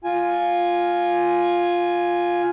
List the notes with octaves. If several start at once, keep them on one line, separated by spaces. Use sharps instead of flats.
F4 G#5